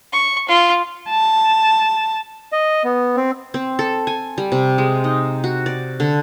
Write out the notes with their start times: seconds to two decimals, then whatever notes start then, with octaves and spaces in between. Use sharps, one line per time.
0.12 C#6
0.48 F4
1.10 A5
2.52 D#5
2.84 B3
3.17 C4
3.54 C4
3.79 A4
4.07 G#5
4.38 G3
4.52 C3
4.78 G#3
5.04 D#4
5.44 F#4
5.66 D5
6.00 D3